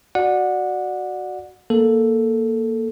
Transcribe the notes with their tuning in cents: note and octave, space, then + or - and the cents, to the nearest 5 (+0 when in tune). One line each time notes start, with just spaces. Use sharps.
F#4 +0 D5 +10 F#5 -20
A#3 +0 A4 +0